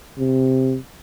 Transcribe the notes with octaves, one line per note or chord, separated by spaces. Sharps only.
C3